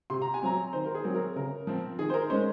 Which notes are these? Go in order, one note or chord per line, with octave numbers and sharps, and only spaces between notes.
C3 C6
A#5
G#5
F#3 C4 A#5
D#3 C5
A#4
G#4
F#3 C4
A#4
C#3 A#4
F3 C4
D#3 G#4
C5
A#4
G#3 C#4 C5